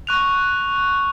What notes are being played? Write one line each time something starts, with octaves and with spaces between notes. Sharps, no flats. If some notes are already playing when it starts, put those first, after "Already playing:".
C#6 F#6 F7